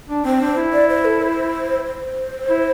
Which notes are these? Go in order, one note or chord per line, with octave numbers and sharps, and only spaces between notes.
D4
C4 C5
D4
E4
D5
C5
A4
C5
C5
E4